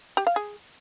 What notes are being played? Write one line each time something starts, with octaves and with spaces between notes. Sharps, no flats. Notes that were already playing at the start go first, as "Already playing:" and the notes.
G4
F5
G#4